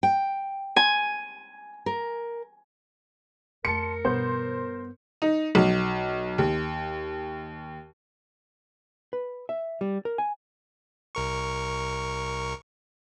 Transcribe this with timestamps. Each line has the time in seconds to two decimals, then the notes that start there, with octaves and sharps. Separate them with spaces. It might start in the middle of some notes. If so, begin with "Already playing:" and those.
0.03 G5
0.76 G#5
1.86 A#4
3.65 F2 A3 A#4 A5 C6 C#7
4.05 G2 B2 E3 B3 C5 G6
5.22 D#4
5.55 B1
6.38 D#2
9.13 B4
9.49 E5
9.81 G3
10.05 A#4
10.18 G#5
11.15 C2 A#4 C#6